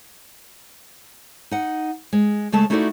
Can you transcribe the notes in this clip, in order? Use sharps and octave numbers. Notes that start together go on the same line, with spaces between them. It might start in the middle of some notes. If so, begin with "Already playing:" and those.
D#4 F#5
G#3
C#3 G#3 A3 A5
A3 D#4 E4 F#4 A4 D5